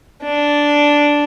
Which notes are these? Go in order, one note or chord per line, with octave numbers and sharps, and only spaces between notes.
D4